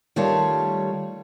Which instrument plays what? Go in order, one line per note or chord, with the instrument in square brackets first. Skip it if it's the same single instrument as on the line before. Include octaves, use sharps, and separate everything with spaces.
[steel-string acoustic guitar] D#3 G3 A3 F4 C#5 A5